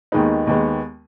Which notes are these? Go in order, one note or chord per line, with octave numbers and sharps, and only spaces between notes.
D#2 D#3 G#3 B3 D#4
D#2 D#3 G#3 B3